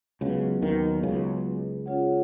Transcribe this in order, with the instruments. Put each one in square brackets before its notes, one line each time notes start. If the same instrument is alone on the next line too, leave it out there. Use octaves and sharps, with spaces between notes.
[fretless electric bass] C#2 C#3 [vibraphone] F#3 B3 F#4 B4 D#5
[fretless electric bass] D#2 D#3
C#2 C#3
[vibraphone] C#4 F4 G#4 C#5 F#5